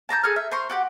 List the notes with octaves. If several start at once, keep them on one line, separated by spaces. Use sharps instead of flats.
A5 A#5 C6 G6
G#4 A4 G#5 F6
E5
C5 A#5 C6 C#6
F#4 G4 F#5